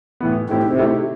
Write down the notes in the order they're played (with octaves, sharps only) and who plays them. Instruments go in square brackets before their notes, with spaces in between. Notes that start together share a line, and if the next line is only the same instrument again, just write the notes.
[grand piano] A2 E3 B3
[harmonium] A2 [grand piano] D#3 A3 C4 E4 G4
[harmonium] C3
[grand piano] D#3 A3 C4 E4 G4